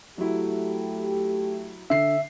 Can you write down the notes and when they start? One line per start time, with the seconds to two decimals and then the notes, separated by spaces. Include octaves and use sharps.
0.18 F#3 A3 E4 G4
1.90 D3 E5 C7